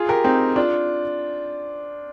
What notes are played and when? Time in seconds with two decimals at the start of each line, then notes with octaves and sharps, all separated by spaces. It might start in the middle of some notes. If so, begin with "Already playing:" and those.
Already playing: F4 G#4
0.09 G4 A#4
0.24 C4 D#4
0.56 D4 F4